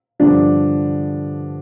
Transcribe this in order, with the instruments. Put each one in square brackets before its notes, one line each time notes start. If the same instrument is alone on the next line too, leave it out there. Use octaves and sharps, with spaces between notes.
[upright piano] G2 D3 F3 D4